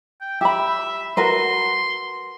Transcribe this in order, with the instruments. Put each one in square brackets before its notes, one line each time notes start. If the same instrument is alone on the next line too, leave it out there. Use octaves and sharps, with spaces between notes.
[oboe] G5
[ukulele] G4 B5 [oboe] E5
[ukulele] F#4 A#4 B4 [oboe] C6